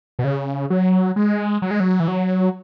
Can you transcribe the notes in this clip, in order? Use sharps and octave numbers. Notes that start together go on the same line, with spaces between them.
B2
C#3
F#3
G#3
F#3
G#3
F#3
E3
F#3